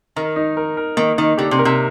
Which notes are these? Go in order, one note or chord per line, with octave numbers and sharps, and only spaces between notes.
D#3 A#4
D#4
A#4
A#4
D#3 A#3
D#3 D#4
D3 G4
C3
A#4
C3